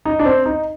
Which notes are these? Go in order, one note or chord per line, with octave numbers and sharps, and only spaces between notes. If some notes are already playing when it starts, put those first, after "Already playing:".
D#4
D4
C4
D#4